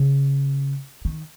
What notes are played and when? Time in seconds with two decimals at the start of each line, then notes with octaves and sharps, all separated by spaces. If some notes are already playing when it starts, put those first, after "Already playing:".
Already playing: C#3
1.05 D#3